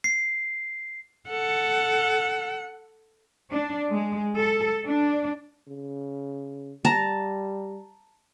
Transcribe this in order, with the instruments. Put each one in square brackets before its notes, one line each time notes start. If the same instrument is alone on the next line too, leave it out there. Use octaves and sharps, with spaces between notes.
[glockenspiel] C7
[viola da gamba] A4 [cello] F#5
[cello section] D4
G#3
A4
D4
[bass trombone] C#3
[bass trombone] G3 [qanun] A5 A#5